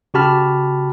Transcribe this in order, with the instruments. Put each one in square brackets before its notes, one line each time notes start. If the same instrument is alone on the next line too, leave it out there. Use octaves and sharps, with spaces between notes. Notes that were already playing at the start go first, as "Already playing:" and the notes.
[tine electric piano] C#3 F#4 G4 A5 B5 F6